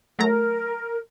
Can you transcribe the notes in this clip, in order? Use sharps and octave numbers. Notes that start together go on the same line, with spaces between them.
F#3 A3 A#4 A#5